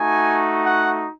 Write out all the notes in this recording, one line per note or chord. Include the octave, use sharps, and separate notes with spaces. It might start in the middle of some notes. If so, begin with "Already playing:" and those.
Already playing: A3 D#4 F#4 G#5
F#5